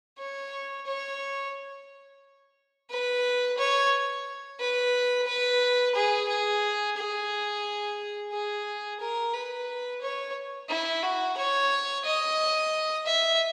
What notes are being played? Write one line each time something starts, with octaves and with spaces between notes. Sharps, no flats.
C#5
C#5
B4
C#5
B4
B4
G#4
G#4
G#4
G#4
A#4
B4
C#5
E4
F#4
C#5
D#5
E5